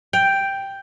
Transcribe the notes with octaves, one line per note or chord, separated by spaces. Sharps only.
G5